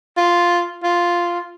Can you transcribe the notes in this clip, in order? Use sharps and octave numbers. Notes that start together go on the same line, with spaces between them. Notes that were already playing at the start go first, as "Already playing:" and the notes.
F4
F4